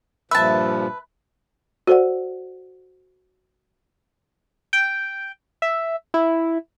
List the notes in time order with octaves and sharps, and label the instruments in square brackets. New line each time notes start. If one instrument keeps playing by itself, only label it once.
[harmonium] G2 A#2 F3 [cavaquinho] B4 A5 [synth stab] E5
[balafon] F#4 A4 C5 D5 F#5
[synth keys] G5
E5
E4